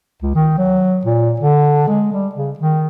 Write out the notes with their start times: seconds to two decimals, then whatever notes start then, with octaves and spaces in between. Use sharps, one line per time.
0.22 C#2
0.35 D#3
0.58 F#3
1.05 A#2
1.40 D3
1.88 G#3
2.12 G3
2.35 C#3
2.59 D#3